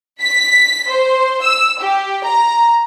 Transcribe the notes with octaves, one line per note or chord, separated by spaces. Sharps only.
B6
C5
E6
G4
A#5